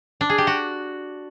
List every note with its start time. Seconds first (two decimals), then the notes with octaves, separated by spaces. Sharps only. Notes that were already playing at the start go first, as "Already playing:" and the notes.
0.21 D4
0.30 G#4
0.38 G4
0.47 F#4